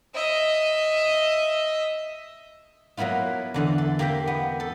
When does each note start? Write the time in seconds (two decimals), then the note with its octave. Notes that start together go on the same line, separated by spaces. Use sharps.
0.15 D#5 E5
2.97 F#3 A#3 B3 E4 F4
3.54 E2 D3 E3
3.78 A4
3.99 A#3 C4 G4 E5 G5
4.27 B3
4.60 A4